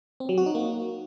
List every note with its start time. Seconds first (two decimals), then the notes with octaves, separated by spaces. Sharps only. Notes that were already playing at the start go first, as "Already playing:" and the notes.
0.20 C4
0.29 F#3
0.38 F#4
0.46 D#4
0.55 A#3